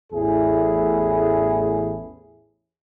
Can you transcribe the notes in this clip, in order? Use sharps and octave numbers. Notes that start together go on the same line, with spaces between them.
A1 E2 A2 E4 G#4